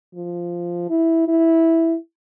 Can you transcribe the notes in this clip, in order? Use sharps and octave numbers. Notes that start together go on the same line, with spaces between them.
F3
E4
E4